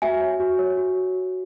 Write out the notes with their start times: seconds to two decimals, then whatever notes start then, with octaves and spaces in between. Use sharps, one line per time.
0.02 F#4 E5 G#5
0.21 C#5
0.40 F#4
0.59 C#5
0.77 F#4